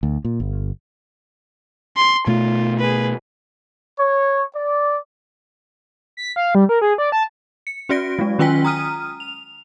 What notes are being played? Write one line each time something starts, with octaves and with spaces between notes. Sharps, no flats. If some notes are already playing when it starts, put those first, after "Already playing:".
D2
A#2
G1
C6
B2 A3 F4
G#4 B4
C#5
D5
B6
F5
G3
A#4
G#4
D5
A5
C#7
C#4 F#4 D5 A#6 D7
F#3 G#3
D#3 C#4 F4 G5 G#5 B6
A#5 D#6 F6 D#7
F7